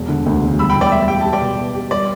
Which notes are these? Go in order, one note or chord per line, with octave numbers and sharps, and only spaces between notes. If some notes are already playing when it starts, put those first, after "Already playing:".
Already playing: E1
D3
D2
E1
G3 B5 E6
G5 B5
A2
D5 G5
G3 E5
G4 G5
G4 A5
D5 G5
B2
B3
G4
G3 D5